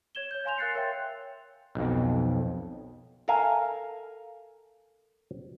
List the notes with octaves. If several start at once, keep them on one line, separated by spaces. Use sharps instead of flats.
C#5 G#6 E7 G7
C#5 G6
C#5 F5 G#5 C6 G6 F7
A#4 F5 F#6 A6 C7 C#7
A#4 C#5 E5 G5 C6
B1 F2
A4 A#4 E5 F5 G#5